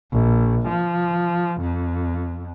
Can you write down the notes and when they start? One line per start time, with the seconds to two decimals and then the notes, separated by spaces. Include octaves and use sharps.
0.12 A#1
0.68 F3
1.61 F2